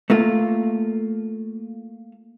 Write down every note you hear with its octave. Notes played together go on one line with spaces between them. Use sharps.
A3 A#3 F4